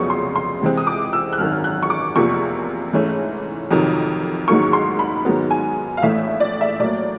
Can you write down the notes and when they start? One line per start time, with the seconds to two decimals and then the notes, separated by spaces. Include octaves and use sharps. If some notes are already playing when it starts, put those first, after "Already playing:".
Already playing: F1 F2 C#3 F#3 B3 C#6
0.10 C6
0.36 C6
0.61 C#2 C3 E3 G#3 C4
0.77 D#6
0.87 D6
1.13 E6
1.33 F#6
1.38 G#1 F#2 D#3 F6
1.64 F#6
1.83 C#6
1.90 D6
2.16 F1 E2 C3 F3 A#3 C#6
2.93 G#2 E3 A3 C#4
3.70 F2 C3 D#3 F#3
4.48 A1 G#2 D#3 F#3 A#3 C#6
4.73 C6
4.99 B5
5.25 G#2 D#3 F#3 B3
5.51 G#5
5.97 F5
6.02 A#1 A2 E3 A3 E5
6.40 D5
6.61 E5
6.80 A2 F#3 A#3 D5